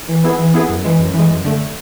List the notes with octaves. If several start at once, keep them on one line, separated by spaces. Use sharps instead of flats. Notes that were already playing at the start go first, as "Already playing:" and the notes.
E3
B3 E4 G#4
E3
B3 E4 G#4
F#2
E3 G#3
F#2
E3 G#3
F#2
D3 A3